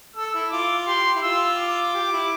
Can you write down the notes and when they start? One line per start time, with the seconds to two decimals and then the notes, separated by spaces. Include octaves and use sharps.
0.16 A4 E6
0.34 E4
0.51 F4 D6
0.87 G4 C6
1.16 E4
1.22 F4 E6
1.58 D6
1.95 G4
2.12 E4